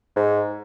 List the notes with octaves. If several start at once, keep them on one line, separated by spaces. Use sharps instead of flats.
G#2